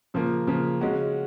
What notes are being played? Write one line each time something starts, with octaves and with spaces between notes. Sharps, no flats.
C#3 F3 A#3
C#3 F3 A#3
C#3 G#3 C#4 F#4